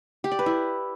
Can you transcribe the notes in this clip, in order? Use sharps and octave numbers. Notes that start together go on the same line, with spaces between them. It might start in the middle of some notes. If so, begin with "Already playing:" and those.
G4
D5
B4
E4